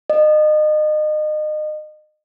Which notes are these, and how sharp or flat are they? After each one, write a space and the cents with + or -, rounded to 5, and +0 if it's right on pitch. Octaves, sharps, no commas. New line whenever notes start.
D#5 -30